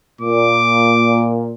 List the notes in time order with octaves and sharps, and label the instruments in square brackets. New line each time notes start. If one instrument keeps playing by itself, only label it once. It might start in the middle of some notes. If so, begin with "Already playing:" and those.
[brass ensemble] A#2 [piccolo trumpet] D6